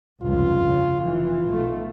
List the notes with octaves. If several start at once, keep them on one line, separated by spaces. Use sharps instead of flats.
F1 C#2 G2 F4
C#3
F1 E3 F4
B1 B2 A3